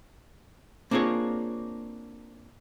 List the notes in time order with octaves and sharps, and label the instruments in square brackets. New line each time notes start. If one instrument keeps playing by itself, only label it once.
[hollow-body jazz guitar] A#3 C4 D4 F4 G#4 C#5